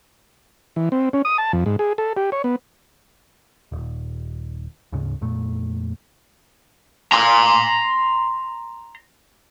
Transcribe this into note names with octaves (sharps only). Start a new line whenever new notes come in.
E3
C4
C#4
D#6
A5
F2
G#2
G#4
A4
G4
C#5
B3
D#1
D2 G#2 C#3
F2 A#2 A3
A#5 C6